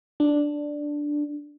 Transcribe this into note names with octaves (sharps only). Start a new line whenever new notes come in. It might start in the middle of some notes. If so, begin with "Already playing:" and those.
D4